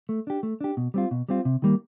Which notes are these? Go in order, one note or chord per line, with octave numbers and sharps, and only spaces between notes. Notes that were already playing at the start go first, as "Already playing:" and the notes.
A3
D4 G4
A3
D4 G4
B2
G3 C4 F4
B2
G3 C4 F4
C3
D#3 G3 A#3